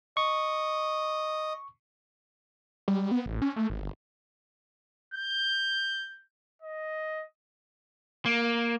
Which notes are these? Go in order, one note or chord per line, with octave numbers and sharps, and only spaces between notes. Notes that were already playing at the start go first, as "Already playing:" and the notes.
D#5 C#6
G3
B3
A1
C#4
A3
G#1
G1
G6
D#5
A#3